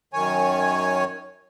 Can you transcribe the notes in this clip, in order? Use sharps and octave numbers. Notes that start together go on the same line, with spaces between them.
F#2 D#3 C#5 G#5